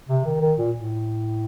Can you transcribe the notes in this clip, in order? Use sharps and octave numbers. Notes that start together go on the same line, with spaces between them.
C3
D#3
D#3
A#2
A2